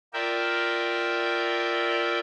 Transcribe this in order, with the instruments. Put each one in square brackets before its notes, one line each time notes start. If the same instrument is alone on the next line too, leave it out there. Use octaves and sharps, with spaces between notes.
[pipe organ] F4 A#4 D5 E5 G5